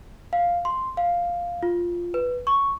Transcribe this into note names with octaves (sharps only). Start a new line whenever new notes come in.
F5
C6
F5
F4
B4
C#6